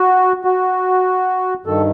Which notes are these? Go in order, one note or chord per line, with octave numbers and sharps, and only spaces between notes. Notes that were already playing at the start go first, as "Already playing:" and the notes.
Already playing: F#4
F#4
G2 D#3 A4